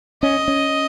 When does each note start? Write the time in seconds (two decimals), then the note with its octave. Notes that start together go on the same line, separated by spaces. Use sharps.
0.23 C#4 D#5
0.48 C#4